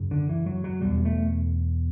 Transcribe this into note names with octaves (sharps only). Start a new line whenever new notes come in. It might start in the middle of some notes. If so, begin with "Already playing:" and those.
Already playing: F#2 C#3
D3
E3
F#3
F#3
E2 B2 G3
A3